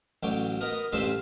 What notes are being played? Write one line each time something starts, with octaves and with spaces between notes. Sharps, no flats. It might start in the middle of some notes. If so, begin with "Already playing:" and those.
A1 F#3 G5 D6
B3 A#4 D#5 A#5
A1 G2 C4 F4 C5 E5